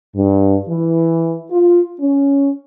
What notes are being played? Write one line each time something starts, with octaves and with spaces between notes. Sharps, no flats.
G2
E3
F4
C#4